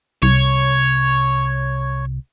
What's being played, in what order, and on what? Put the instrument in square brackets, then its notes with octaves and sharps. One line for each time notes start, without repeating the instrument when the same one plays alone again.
[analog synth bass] C2 [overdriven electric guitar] C#5